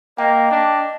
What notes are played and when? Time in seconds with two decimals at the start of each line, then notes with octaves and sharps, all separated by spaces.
0.18 A#3 D#5 G5
0.51 D4